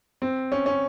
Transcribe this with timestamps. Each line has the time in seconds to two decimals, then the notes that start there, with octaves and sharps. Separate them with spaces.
0.22 C4
0.52 C#4
0.66 C#4